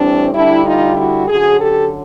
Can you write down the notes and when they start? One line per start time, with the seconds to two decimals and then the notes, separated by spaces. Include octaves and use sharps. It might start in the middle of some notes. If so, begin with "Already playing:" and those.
Already playing: A2 E3 G3 C4 D4
0.33 D2 D3 G3 D4 E4
0.65 D#4 F4
0.97 E4 F#4
1.28 F#2 D3 F#3 F#4 G#4
1.59 G4 A4